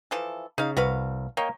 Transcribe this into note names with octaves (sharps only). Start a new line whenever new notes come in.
E3 F3 A4
C#3 D#4 F5
C2 F#4 B4 F5
A#3 C#5 D#5 G5